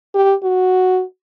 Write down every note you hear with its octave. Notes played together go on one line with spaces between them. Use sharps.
G4
F#4